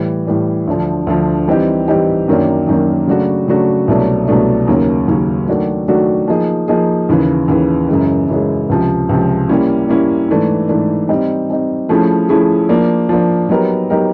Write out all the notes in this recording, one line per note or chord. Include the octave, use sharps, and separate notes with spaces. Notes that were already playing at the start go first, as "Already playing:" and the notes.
Already playing: A2 E3 G3
A2 E3 G3
D2 D3 F3
D2 D3 F3
E3 G3 C4 D#4 G4
E3 G3 C4 D#4 G4
F#2 D#3 F#3 A#3 D4
F#2 D#3 F#3 A#3 D4
C#3 F#3 A3 D4 F#4
C#3 F#3 A3 D4 F#4
C2 B2 F#3 A3 D4
C2 B2 F#3 A3 D4
D#2 C#3 F#3 A#3 C#4
D#2 C#3 F#3 A#3 C#4
D#3 F#3 A3 D4 F#4
D#3 F#3 A3 D4 F#4
F3 A#3 D#4 G#4
F3 A#3 D#4 G#4
D#2 C#3 E3
D#2 C#3 E3
F#2 C#3 E3 G#3
F#2 C#3 E3 G#3
C#2 C3 F3
C#2 C3 F3
G3 A#3 C#4 E4
G3 A#3 C#4 E4
G#2 E3 A3 D4
G#2 E3 A3 D4
G3 C4 D#4
G3 C4 D#4
F3 A3 C#4 E4 G#4
F3 A3 C#4 E4 G#4
F3 A#3 D4
F3 A#3 D4
F#3 B3 D#4 G4 A#4
F#3 B3 D#4 G4 A#4